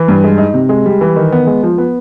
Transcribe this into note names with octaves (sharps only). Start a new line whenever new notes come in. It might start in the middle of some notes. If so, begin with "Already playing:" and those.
Already playing: E3
G2
G#3
D#4
C3
G#3
G3
E3
D#3
B3
G#3
F3
B3